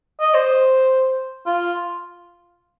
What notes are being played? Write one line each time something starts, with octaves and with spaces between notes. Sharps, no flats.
D#5
C5
F4